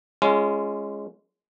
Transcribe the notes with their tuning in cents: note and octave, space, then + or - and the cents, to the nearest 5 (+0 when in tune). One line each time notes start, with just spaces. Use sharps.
G#3 +0 C#4 +0 F4 -35